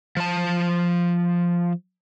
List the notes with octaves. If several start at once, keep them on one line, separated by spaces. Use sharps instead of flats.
F3 A5